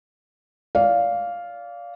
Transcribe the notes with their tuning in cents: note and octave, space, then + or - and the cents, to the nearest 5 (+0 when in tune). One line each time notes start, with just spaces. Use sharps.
D5 -30 F5 +0